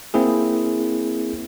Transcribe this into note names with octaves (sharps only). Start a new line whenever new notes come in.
A#3 C4 E4 G#4